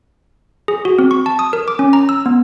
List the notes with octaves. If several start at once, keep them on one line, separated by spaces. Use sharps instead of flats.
G#4
F#4
C4
C#6
A5
D#6
A#4
D6
C#4
A#5
E6
B3